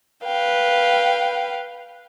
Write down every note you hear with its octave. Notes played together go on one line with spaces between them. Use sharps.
B4 F5 G5